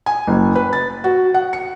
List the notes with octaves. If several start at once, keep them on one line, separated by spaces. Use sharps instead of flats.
G#5
F#1
B4
A6
F#4
F#5
C#7